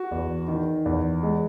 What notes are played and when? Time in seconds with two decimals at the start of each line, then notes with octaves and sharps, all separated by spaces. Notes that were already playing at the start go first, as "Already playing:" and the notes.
Already playing: F#4
0.11 E2
0.48 D#3
0.86 E2
1.23 G#3